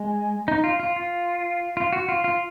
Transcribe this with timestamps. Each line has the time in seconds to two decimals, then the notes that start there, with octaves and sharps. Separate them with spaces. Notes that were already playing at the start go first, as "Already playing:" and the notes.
Already playing: G#3
0.48 D#4
0.64 F4
0.80 F4
0.96 F4
1.77 F4
1.93 F#4
2.09 F4
2.24 F4